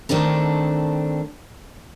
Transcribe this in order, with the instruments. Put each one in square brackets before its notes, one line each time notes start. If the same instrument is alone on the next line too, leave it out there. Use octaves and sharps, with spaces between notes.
[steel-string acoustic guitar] D#3 A3 C4 D4 A4